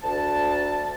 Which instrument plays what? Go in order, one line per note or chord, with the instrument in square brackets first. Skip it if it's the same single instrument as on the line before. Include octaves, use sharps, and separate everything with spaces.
[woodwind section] D2 A5